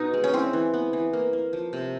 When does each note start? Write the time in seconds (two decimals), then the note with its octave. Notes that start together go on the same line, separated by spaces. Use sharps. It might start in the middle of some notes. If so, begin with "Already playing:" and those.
Already playing: B2 B3 D#4
0.13 G#3
0.24 C#4
0.33 E3 C4
0.53 E3
0.74 B3
0.93 E3
1.13 A#3
1.33 A#3
1.53 F3
1.73 C3